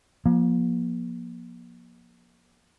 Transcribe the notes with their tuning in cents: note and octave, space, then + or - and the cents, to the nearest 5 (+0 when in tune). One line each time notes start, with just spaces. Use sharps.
F3 +15 A#3 +35